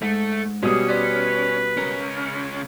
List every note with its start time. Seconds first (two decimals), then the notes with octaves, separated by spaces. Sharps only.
0.02 G#2 A3
0.63 B2 G3 C#4 G#4 D#6
0.89 B4 C5 D5
1.77 C#2 C#4 A#4